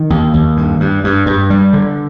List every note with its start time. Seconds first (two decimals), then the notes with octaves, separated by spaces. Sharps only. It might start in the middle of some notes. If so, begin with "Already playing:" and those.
Already playing: D#3
0.10 D#2
0.34 D#2
0.57 G2
0.80 G2
1.04 G2
1.26 G2
1.50 G3
1.73 D3